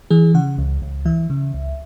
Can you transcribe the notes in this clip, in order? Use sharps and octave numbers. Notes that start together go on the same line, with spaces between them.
E3 G#4
C#3 F#5
C#2
C#2
E3 E5
C#3
C#2